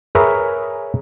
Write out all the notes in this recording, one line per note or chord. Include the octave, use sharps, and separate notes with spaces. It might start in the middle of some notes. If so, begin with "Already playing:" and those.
G#4 A#4 B4 C#5 E5 A#5